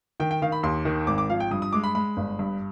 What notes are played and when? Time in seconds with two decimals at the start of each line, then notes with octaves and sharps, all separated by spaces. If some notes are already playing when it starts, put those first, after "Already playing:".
0.20 D#3 G5
0.31 G5
0.42 D#3 F5
0.52 B5
0.63 D#2 C6
0.85 D#3
1.07 G#1 D6
1.18 D6
1.29 F3 F5
1.40 G5
1.51 G2 D#6
1.62 D#6
1.73 G#3 D6
1.84 B5
1.95 G#3 B5
2.17 G1
2.39 G2